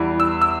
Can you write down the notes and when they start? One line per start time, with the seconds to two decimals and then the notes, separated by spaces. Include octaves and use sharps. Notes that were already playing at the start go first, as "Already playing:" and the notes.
Already playing: E2 E3 G3
0.20 E6
0.42 E6